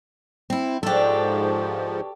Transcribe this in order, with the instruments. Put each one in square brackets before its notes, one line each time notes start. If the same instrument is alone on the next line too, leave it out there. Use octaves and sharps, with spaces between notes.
[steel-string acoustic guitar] C4 E4
[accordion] G#2 F3 [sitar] B2 D4 [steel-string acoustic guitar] G4 A4